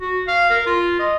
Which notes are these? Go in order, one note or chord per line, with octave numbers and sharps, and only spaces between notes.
F#4
F5
A#4
F4
D#5